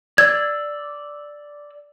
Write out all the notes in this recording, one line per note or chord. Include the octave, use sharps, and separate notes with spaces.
D5 E6 G#6